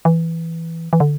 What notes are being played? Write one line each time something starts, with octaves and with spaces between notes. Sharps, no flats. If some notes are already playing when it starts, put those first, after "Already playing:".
E3
E3
D3